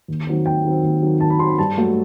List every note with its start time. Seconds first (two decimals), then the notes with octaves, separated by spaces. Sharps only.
0.08 D#2
0.27 D#3 F#3 C4
0.46 D#2 G5
0.65 D#3 F#3 C4
0.83 D#2
1.02 D#3 F#3 C4
1.20 D#2 A5
1.30 B5
1.39 D#3 F#3 C4 C6
1.49 B5
1.58 G2 A5
1.77 F#3 A3